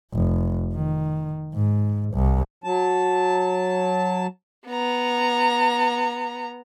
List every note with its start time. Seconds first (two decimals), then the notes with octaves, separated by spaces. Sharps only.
0.13 F1
0.74 D#3
1.54 G#2
2.14 C2
2.64 F#3 A5
4.68 B3 A#5